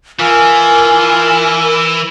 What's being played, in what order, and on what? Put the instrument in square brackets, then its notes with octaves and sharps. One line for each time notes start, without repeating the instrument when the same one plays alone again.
[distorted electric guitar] E3 [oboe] F4 [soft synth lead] A#4 [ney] G#5